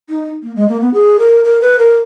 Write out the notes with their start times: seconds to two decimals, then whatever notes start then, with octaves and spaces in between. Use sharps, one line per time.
0.09 D#4
0.43 A#3
0.56 G#3
0.68 A#3
0.81 B3
0.94 G#4
1.19 A#4
1.44 A#4
1.61 B4
1.79 A#4